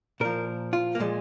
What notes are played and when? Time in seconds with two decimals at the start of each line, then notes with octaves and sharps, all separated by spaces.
0.20 A#2 F3 A#4
0.73 F4
0.95 A#3
1.00 A#2 F3 G#3